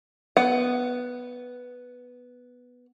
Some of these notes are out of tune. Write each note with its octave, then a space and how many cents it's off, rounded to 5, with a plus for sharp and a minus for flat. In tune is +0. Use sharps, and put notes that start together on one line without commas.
B3 +0 F#5 +15